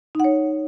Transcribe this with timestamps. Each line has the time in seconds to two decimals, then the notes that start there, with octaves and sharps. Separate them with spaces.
0.15 D#4
0.20 F#5
0.24 C#5